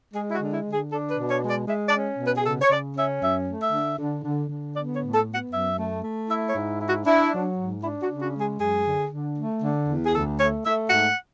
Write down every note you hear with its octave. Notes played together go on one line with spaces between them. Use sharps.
G#3 G#4
E4
F#4
D3
E4
D3
G#4
D4 A4
B4
B2
C#5
G#3
D5
G#3 E5
D5
C#4
B2
B4
G#4
C#3 A4
C#5
C#3 D5
C#4 E5
F#2 E5
A3
E5
D3
D3
D3
D3
B3 D5
C#5
A2
A4
B3
F#5
F#2 E5
A3
A3
E4 E5
C#5
G#2
E4
F#4
D4 E4
F#3
G#2
D4 E4
F#4
C#3
F#4
G#3
G#4
F#2 G#4
D3
D3
A3
D3
E2
G#4
D2 A4
A3 C#5
A3 E5
G#2 F#5